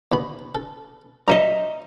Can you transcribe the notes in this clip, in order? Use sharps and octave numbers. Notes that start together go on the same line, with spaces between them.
D#2 B3 B5
A4
G2 F#3 D#5 E5 A#5